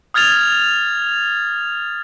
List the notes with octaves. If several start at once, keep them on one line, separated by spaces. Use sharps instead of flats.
D#6 F6 G#6 A6 F7